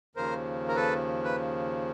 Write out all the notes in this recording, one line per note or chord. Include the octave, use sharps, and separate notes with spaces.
D#2 C#3 F3 A#4 C5
A#4
A4 B4
B4